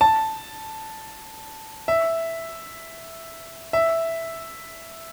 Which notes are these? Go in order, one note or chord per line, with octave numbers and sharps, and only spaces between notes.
A5
E5
E5